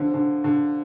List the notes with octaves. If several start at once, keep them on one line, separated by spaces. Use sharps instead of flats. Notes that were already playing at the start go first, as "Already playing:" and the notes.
Already playing: D3 F3 C4
D3
D3